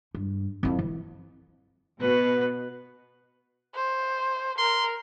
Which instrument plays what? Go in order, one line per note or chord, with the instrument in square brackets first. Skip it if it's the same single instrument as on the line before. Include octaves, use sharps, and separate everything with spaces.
[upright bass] G2
F2 E4
E3
[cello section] B2 [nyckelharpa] B4
[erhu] C5
[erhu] A#4 [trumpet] C6